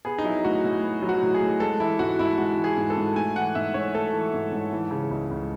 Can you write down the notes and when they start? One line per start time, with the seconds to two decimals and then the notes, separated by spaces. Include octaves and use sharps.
0.05 B3 G#4
0.18 D#4
0.24 F#3 E4
0.44 A2 F#4
0.64 A2
0.83 B3
1.02 F#3
1.09 F#4
1.23 A2
1.34 G#4
1.42 A2
1.60 G#3 A4
1.80 E3 E4
1.99 G#2 F#4
2.19 G#2 E4
2.38 G#3 F#4
2.57 E3
2.64 G#4
2.77 G#2
2.90 A4
2.97 G#2
3.16 A3 G#5
3.36 E3 F#5
3.55 G#2 E5
3.74 G#2 C#5
3.94 A3 A4
4.13 E3
4.34 G#2
4.52 G#2
4.73 E3
4.91 C#3
5.11 C#2
5.31 C#2